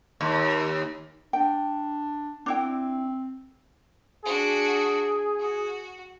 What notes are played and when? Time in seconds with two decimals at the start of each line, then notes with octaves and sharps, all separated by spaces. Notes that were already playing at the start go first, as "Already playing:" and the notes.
0.21 D#2
1.33 D4 G5
2.46 C4 D4 E4 G5
4.25 D4 F#4 G#4
5.39 F#4